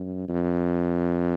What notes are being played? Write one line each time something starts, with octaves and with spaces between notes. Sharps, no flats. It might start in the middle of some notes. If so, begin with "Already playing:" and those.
Already playing: F#2
F2